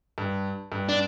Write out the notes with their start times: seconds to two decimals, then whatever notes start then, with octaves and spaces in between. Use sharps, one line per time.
0.18 G2
0.72 G2
0.89 D4